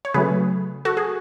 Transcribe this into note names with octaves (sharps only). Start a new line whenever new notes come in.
C#5
C#3 F#3 A3 G#4 B4
F#4 A4
G#4